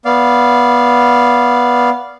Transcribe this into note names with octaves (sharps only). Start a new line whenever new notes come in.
B3 D5 F5